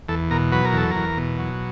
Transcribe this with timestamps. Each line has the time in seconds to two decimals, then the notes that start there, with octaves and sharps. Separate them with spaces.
0.08 E2 A4
0.30 B2 A#4
0.52 F#3 B4
0.64 A#4
0.73 E2 A4
0.91 E2 A#4
1.17 B2
1.38 F#3